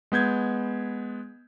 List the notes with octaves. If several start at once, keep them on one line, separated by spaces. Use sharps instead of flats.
G#3 B3 G6 G#6